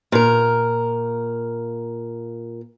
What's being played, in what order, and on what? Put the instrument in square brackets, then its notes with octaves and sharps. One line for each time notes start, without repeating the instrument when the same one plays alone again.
[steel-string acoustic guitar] A#2 A#4